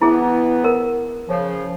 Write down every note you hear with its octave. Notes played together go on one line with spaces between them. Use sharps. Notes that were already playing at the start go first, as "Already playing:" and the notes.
E3 B3 E4 G#4
A#4
C#3 F3